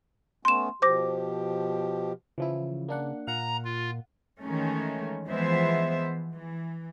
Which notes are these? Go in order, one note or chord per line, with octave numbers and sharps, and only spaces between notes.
A3 B3 C#4 C6 E7
B2 F3 G4 C5 D6 A#6
C#3 E3 F3 E4
A#3 D4 F#5
A#2 F5 F#5 A#5
F4
D#3 E3 G#3 A3 C#4
E3 F3 G#3 B3 C5 E5
E3